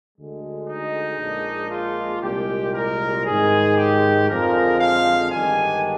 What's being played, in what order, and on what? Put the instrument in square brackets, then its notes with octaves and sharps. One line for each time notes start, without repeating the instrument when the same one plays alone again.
[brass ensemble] D2 D3 G#3
D#4
A#1 A#2 G#3 D4
F4
C2 A#2 G#3 G4
A#4
G#2 D#3 G#3 G#4
G4
F2 D3 F3 G#3 A#4
F5
G1 G2 D#3 G#3 D4 G#5